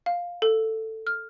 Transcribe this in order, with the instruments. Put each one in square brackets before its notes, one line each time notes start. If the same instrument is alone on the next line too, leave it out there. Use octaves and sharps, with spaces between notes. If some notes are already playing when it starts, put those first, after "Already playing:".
[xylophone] F5
A4
F6